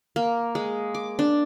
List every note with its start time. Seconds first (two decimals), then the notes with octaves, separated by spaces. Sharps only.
0.16 A#3
0.55 G#3
0.94 D6
1.19 D4